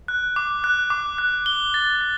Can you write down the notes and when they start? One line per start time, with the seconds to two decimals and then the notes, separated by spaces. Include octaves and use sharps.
0.08 F#6
0.36 D6
0.64 F#6
0.90 D6
1.18 F#6
1.46 G7
1.74 A6
2.01 A6